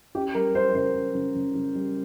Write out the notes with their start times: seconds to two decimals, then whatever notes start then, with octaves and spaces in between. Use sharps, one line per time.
0.15 C#4 G4
0.34 G3 A#4
0.55 C#4 C5
0.69 A#4
0.75 C#3 C5
0.95 C#4
1.15 C#3
1.35 C#3
1.55 C#3
1.75 G3